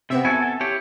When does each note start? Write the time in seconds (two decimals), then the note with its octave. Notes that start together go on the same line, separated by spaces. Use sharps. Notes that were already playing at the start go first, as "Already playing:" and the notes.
0.10 C3 B3 C4 E5
0.25 E4 F#4 A4 G#5
0.42 A4
0.61 E4 G4 C#5